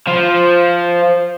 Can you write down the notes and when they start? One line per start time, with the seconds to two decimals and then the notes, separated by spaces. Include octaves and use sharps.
0.07 F3